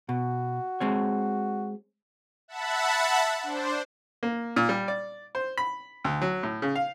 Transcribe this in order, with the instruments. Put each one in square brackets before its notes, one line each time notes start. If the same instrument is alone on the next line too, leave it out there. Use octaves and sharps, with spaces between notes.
[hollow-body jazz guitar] B2 [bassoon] F#4
[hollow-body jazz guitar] G#3 C4 C#5
[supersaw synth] E5 F#5 A5 B5
D4 C5
[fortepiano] A#3
A#2
G3
D5
C5
B5
D2
F#3
A2
C#3
F5